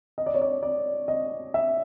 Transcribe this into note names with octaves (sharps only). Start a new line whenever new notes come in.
D#5
D5
C#5
D5
D5
D#5
E5